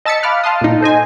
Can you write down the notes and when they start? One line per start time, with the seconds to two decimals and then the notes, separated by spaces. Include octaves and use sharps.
0.05 D#5 A5 E6 A6 B6 C#7
0.23 F5 B5 D6 F6 F#6
0.44 F5 A5 C6 D#6
0.61 A#2 D#4
0.81 A4 C5 D#5 G#5